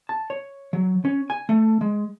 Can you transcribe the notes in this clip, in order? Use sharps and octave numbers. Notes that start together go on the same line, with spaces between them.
A5
C#5
F#3
C#4
G#5
A3
G#3